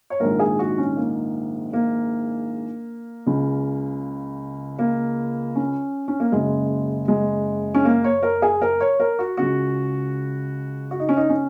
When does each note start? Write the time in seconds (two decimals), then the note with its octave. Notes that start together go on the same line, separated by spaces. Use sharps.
0.10 C#5
0.20 A#1 G#2 D#3 A#4
0.39 G#4
0.59 F#4
0.78 C#4
0.97 A#3
1.73 A#3
3.26 C#2 C#3
4.79 A#3
5.55 C#4
6.08 C#4
6.20 A#3
6.32 F#1 F#2 C#3 G#3
7.08 G#3
7.74 C#4
7.85 A#3
8.04 C#5
8.23 A#4
8.42 G#4
8.61 A#4
8.81 C#5
9.00 A#4
9.19 F#4
9.37 C#2 C#3 F#4
10.91 F#4
11.00 D#4
11.09 C#4
11.17 D#4
11.29 C#4